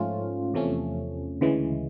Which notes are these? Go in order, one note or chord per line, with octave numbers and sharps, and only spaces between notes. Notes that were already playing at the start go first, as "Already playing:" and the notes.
Already playing: G#2 F3 A3 C#4 F4
E2 C3 F3 A3 C#4
D2 C#3 E3 G#3